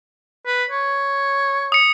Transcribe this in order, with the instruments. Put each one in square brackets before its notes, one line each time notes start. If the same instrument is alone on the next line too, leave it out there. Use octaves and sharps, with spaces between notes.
[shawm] B4
C#5
[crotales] D#6 C#7